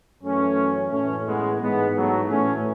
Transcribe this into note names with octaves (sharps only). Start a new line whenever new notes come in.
F#2 E3 A3 C#4
A2 E3 A3 C#4
G#3 B3
G#2 E3 G#3 B3
F#3 A3
A2 E3 A3 C#4